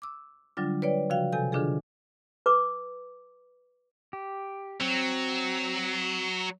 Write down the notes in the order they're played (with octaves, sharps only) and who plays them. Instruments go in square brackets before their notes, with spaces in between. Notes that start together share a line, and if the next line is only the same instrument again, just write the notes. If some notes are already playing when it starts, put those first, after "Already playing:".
[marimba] D6 E6
D3 F#3 G3 D4 F4
B4 C#5 D5 G5
C#3 F3 F#4 F5 G5
C3 A4 G#5 G6
D3 D#3 D4 F4 G#4 A4
[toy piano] B4 D6
[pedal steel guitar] G4
[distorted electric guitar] F#3 [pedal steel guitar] C4